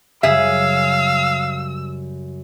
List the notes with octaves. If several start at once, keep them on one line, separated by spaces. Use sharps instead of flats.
F#2 C#3 G3 G#4 E5 F5 E6